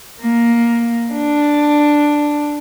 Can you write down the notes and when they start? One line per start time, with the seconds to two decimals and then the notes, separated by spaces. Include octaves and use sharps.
0.20 A#3
1.11 D4